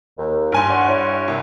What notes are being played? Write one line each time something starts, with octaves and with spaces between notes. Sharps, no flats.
D#2
G2 G#5 C6
C#5 D5 F#5
E4 C#5
C2